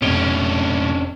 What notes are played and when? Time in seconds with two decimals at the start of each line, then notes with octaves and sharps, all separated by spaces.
0.02 F1 B1 A2 C#4 D4 D7 G7